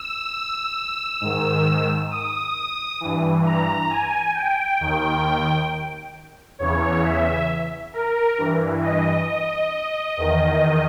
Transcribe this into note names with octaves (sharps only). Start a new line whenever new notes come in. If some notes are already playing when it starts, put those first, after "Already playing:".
Already playing: E6
G#2 D#3
D#6
G2 E3
A#5
G#5
G5
D#2 D#3
E2 C#3 E3 C#5
E5
A#4
G2 E3
D#5
D#5
E2 D#3